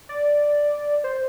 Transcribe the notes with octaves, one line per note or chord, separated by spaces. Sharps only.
D5
C5